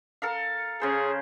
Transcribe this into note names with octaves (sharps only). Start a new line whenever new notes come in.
A4 A#4 F5
C#3 G#4 C5